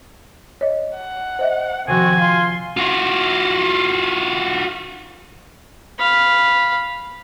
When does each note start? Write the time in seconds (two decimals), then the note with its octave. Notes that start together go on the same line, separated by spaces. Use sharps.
0.61 C#5 D#5
0.97 F#5
1.39 C5 D#5 E5
1.88 C3 D#3 F3 C4 F#4 G#5
2.19 F4 C6
2.77 F4 F#4
5.99 F5 B5